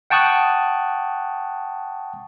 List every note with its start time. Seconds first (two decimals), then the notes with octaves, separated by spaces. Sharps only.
0.10 F#5 G5 A5 C#6 D#6 F#6